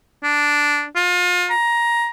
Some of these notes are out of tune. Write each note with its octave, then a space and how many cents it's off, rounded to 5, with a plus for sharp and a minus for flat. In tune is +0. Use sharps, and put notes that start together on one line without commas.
D4 -5
F4 +35
A#5 +15